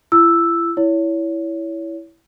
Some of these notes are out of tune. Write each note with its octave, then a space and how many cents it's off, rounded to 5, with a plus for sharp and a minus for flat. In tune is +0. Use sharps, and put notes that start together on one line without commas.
E4 +40 E6 +0
E4 +0 C#5 +25